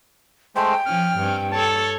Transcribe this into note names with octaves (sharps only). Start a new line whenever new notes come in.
G#3 A3 C5 G5
F3 C#4 F6
G2 C4 C#4
A4 C#5 A5